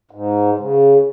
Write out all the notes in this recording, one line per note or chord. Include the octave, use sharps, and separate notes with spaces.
G#2
C#3